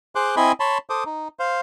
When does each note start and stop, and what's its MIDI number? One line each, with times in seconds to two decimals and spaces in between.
0.15 0.36 68
0.15 0.36 72
0.15 0.36 84
0.15 0.36 86
0.15 0.36 90
0.37 0.52 60
0.37 0.52 64
0.37 0.52 75
0.37 0.52 80
0.37 0.52 83
0.37 0.52 84
0.60 0.78 73
0.60 0.78 81
0.60 0.78 83
0.60 0.78 84
0.90 1.04 69
0.90 1.04 72
0.90 1.04 86
0.90 1.04 87
1.06 1.28 63
1.39 1.61 72
1.39 1.61 77